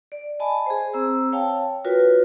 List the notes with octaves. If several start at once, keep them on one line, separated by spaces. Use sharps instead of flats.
D5
D#5 G#5 A5 B5
G#4 C5
C4 C5 A#5 E6
C#5 F5 G5 A5
F4 F#4 A#4 B4 C#5